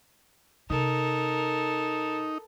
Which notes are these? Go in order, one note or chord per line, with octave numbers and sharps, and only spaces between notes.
C3 D#4 A4 A#4